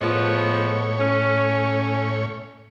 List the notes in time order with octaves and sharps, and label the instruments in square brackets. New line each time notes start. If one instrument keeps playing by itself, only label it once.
[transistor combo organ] A2 C#5 [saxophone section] F3 G#3 B3
[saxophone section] C#4